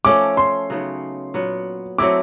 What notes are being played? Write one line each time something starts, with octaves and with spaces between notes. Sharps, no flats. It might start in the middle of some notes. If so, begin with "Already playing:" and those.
F3 A3 C#4 D6
C6
C#3 F#3 B3 D#4
A#2 F#3 B3
F#3 A3 C4 E4 D6